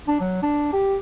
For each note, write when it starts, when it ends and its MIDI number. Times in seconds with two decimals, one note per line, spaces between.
0.08 0.17 62
0.20 0.41 54
0.43 0.72 62
0.73 0.97 67